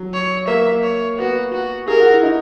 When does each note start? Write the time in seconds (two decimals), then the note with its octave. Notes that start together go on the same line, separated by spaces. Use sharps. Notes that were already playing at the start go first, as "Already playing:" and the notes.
Already playing: F#3
0.13 C#5
0.48 A#3 E5
0.83 C#5
1.18 B3 F#4
1.53 F#4
1.88 G#4 A#4
2.00 F#4
2.11 E4
2.23 D#4